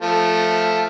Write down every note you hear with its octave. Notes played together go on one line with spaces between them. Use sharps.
F3 A3 A5